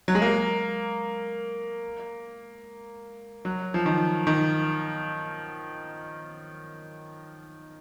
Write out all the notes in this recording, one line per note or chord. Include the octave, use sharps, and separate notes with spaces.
F#3
G#3
A#3
F#3
F3
D#3
D#3